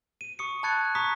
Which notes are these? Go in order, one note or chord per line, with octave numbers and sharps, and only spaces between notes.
D#7
C#6 D#6 C#7
A5 B5 F#6 G#6 A6 C#7
A#5 C#6 D#6 B6